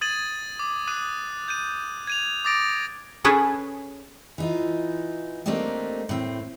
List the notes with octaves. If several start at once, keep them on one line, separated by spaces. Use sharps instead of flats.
D#6 G#6 A6 D#7 F#7
D6
D6 D#6 F#6 D#7
G6 D#7
G#6 D#7 F7
D6 D#6 A6 A#6 D7
C#4 G#4 A4 B4
E3 D#4 F4
A3 A#3 C4 D4 D#4 G4
A2 C4